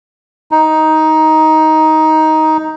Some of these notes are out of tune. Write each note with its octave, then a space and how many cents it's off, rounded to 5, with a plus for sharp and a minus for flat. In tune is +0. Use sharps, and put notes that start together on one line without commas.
D#4 +10